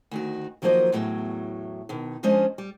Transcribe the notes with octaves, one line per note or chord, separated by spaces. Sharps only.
D2 D#3 F#4
D#3 F3 F#3 A#3 C5 D#5
E2 A2 F#3
B2 D#3
F3 G#3 C#4 D4 C5 D#5
G3